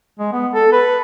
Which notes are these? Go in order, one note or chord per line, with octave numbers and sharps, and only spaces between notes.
G#3
B3
A4
B4